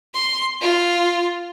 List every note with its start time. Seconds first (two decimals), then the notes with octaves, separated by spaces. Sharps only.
0.15 C6
0.61 F4